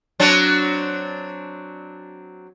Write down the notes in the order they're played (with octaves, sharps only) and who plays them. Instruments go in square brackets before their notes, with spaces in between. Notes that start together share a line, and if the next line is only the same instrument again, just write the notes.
[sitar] F#3 C4 D4